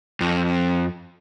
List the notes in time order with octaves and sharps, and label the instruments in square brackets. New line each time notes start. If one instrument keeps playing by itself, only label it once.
[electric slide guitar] F2